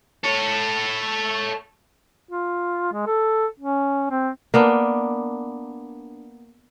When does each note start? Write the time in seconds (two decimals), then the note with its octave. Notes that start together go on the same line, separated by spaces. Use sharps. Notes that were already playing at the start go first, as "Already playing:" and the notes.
0.24 A4 C#5
2.29 F4
2.93 G#3
3.07 A4
3.60 C#4
4.11 C4
4.54 A#3 B3 D4